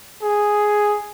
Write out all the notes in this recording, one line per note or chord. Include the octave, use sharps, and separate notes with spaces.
G#4